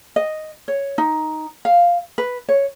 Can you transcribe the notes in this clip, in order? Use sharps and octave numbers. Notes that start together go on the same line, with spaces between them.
D#5
C#5
D#4
F5
B4
C#5